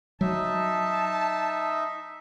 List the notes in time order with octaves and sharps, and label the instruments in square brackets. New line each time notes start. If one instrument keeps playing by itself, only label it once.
[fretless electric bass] F#3 [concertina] D#4 E5 [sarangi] A5